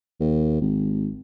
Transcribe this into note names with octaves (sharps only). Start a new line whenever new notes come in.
D#2
G#1